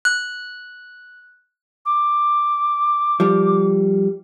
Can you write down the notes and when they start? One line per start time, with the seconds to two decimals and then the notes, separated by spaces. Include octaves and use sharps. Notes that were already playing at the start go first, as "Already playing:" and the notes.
0.05 F#6
1.85 D6
3.20 F3 G3